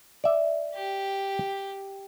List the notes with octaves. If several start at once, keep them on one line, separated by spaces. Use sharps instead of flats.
D5 E5
G4